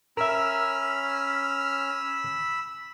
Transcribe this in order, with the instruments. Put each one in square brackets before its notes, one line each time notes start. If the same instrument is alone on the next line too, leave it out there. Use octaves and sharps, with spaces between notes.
[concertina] C#4 F6 [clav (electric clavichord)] A#4 E5 [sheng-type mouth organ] B5 E6